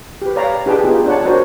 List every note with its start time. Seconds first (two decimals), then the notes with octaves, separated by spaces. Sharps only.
0.22 G4 B4
0.36 C#5 D5 F5 A#5 B5
0.66 D4 G4 G#4 B4 G5 A5
0.84 B3 D#4 F4 G4 G#4
1.06 D4 C#5 F#5 A5
1.25 D4 F#4 A#4 C5 C#5